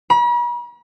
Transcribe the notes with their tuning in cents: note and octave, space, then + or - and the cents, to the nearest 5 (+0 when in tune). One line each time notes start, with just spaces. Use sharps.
B5 -45